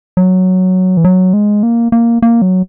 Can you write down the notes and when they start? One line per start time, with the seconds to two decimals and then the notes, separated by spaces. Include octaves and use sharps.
0.17 F#3
0.97 E3
1.04 F#3
1.33 G#3
1.63 A#3
1.92 A#3
2.22 A#3
2.42 F#3